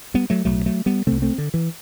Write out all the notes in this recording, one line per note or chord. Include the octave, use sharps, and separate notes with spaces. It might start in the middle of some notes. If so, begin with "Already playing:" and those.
G3 B3
F#3 A3
B1 A2 F#3 A3
F#3 A3
G3 B3
C2 C3 A3 C4
A3 C4
D3
E3